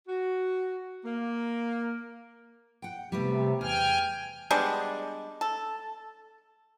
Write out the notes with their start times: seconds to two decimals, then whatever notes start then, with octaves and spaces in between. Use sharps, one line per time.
0.07 F#4
1.05 A#3
2.82 F#5 G5
3.12 C3 G3 A3 B3
3.61 E2 G5 G#5 F6
4.51 G3 G#3 B3 D4
5.41 A4